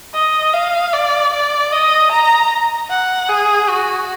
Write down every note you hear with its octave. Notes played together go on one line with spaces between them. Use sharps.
D#5
F5
D5
D5
D#5
A#5
F#5
G#4
F#4